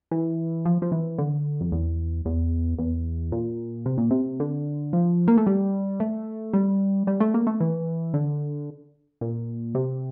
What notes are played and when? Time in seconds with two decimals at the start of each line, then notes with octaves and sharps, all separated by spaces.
0.11 E3
0.65 F3
0.82 F3
0.92 E3
1.18 D3
1.61 F2
1.72 E2
2.25 E2
2.79 E2
3.32 A#2
3.86 C3
3.98 A#2
4.11 C3
4.40 D3
4.93 F3
5.28 A#3
5.37 A3
5.47 G3
6.00 A3
6.53 G3
7.07 G3
7.20 A3
7.34 A#3
7.47 A3
7.61 E3
8.14 D3
9.21 A#2
9.75 C3